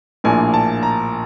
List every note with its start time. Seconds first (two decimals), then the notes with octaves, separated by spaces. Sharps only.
0.24 A#1 A2 F3 A#3 D4 G#5
0.54 A5
0.83 A#5